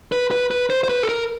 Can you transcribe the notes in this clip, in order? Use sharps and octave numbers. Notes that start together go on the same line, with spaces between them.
B4
B4
B4
C5
C5
B4
A4
A#4